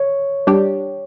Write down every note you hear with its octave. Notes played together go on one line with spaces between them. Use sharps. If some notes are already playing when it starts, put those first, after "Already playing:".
Already playing: C#5
G3 D4 G4